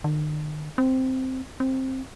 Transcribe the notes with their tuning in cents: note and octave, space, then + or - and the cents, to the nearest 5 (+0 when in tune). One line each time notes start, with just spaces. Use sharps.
D#3 -45
C4 -5
C4 +10